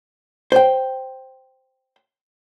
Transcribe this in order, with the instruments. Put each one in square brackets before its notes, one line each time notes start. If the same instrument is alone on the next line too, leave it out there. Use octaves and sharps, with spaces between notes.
[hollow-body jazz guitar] C5 G5